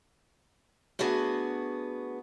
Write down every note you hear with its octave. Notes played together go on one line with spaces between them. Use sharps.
A3 B3 D4 F#4 G#4